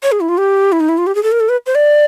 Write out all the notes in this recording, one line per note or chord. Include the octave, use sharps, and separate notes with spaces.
C#5
G#4
E4
F4
G4
E4
D#4
E4
F4
G4
G#4
A4
A#4
A4
B4
C5
D5